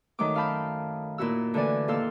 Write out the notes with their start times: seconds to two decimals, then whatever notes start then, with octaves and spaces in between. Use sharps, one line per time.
0.19 D#3 F#3 A3 D#4 D6
0.35 F#2 F5 A5 B5 G6
1.18 A#2 E4 F#4 E6
1.54 D3 E3 A3 D5 G#5
1.88 D#2 A#2 A4 F5 C6 E6